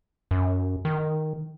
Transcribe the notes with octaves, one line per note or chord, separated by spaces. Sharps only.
F#2
D#3